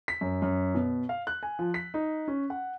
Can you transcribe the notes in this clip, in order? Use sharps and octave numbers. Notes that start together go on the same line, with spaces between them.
B6
F#2
F#2
B2
F5
F#6
G#5
F3
B6
D#4
C#4
F#5